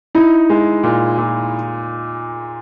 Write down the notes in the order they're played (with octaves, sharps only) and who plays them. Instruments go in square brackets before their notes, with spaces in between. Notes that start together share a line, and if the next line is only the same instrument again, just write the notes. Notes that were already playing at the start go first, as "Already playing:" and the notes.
[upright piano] D#4 [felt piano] E4
[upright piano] G#3
A#2
A#2